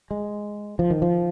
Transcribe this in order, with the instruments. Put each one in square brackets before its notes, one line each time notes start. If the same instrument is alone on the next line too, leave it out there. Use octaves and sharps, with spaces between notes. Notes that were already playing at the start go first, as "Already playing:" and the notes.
[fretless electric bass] G#3
F3
D#3
F3